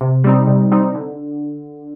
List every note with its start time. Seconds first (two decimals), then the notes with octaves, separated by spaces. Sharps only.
0.01 C3
0.24 G3 C4 D#4
0.47 C3
0.72 G3 C4 D#4
0.95 D3